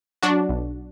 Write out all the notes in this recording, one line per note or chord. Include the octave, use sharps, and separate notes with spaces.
F#3 D4 F#4
B1